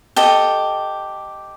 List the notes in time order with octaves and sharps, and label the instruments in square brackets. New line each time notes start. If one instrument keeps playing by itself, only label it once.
[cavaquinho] G4 A4 D#5